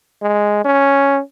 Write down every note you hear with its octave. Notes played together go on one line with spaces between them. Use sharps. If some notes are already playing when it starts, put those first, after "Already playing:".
G#3
C#4